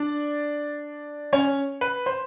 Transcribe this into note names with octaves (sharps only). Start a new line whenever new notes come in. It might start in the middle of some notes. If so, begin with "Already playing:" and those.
Already playing: D4 D5
C#4 C#5
B4
C5